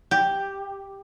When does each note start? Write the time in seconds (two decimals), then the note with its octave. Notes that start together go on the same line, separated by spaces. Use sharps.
0.11 G4